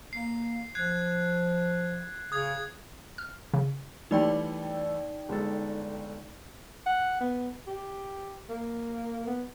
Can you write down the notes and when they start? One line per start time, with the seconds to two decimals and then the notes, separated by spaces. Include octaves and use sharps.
0.13 A#3 C7
0.75 F3 F#6 G#6 C7
2.32 C#3 D#6 G#6
3.18 F6
3.54 C#3
4.11 E3 G3 A3 D#4 D5 G5
5.29 G1 G#3 A4
6.86 F#5
7.20 B3
7.67 G4
8.49 A#3
9.27 B3